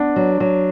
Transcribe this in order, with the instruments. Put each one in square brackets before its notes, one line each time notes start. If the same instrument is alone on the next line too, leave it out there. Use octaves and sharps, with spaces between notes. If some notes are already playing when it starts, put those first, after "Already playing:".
Already playing: [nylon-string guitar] B3 [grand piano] D4
[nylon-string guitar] F#3
F#3